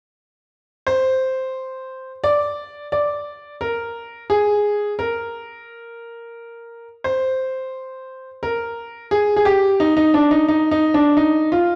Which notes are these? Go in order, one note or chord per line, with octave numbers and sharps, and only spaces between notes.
C5
D5
D5
A#4
G#4
A#4
C5
A#4
G#4
G#4
G4
D#4
D#4
D4
D#4
D#4
D#4
D4
D#4
F4